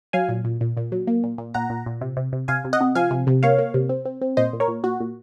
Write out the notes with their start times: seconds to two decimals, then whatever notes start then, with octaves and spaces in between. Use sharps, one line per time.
0.13 F#3 F5 G#5
0.29 A#2
0.44 A#2
0.61 A#2
0.77 A#2
0.92 F#3
1.07 A#3
1.24 A#2
1.38 A#2
1.54 A#2 F#5 A#5
1.70 A#2
1.86 A#2
2.01 C3
2.17 C3
2.33 C3
2.48 C3 F5 G#5
2.64 C3
2.73 D#5 F#5
2.80 C3
2.95 F3 F5 G#5
3.11 C3
3.27 C3
3.43 A#3 C#5 F5
3.58 A#3
3.74 C3
3.89 C4
4.05 C4
4.22 C4
4.37 A#2 C5 D#5
4.53 A#2
4.60 A#4 C#5
4.68 A#2
4.83 A#2 F#4
5.00 A#2